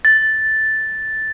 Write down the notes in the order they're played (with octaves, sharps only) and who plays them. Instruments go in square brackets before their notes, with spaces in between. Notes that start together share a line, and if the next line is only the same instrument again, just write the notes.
[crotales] A6